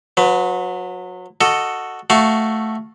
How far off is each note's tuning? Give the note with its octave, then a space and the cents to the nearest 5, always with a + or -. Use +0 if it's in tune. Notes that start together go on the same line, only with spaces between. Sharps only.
F#3 -25 B4 +15
F#4 +0 A4 +10 D#5 +0
A3 +0 F#4 +5 F5 +10